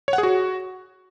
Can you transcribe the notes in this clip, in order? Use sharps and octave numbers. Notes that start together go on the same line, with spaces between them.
C#5
F#5
G#4
F#4